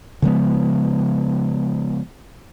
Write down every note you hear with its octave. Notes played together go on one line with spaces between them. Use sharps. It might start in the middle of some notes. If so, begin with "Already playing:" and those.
C#3 F3 G#3 B3